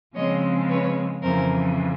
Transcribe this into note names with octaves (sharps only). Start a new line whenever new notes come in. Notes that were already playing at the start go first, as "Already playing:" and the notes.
C#3 F3 G#3 C4 C#5 D#5
B4 C#5
F2 C#3 E3 A#4 C5